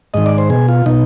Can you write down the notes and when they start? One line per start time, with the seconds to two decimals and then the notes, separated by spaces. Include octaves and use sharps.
0.14 G#2 D#3 D#5
0.26 D5
0.38 C5
0.49 B2 G#4
0.68 F4
0.86 B2 D#4